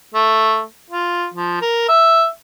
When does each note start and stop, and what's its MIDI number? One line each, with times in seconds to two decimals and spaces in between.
0.15 0.63 57
0.90 1.27 65
1.34 1.60 53
1.62 1.84 70
1.89 2.27 76